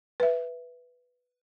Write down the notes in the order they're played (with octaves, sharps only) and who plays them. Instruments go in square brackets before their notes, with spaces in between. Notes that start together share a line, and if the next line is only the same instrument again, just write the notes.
[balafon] B4 E5